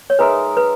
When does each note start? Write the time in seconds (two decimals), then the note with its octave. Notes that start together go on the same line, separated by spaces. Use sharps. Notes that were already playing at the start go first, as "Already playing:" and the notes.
0.10 C#5
0.19 G#3 D#4 A#4 B4 E5
0.57 B4